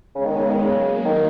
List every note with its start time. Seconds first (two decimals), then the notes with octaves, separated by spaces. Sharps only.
0.15 C#3 G#3 B3
0.25 D#3
0.36 C#3
0.50 D#3
0.60 C#3 F#3 A#3
1.05 D#3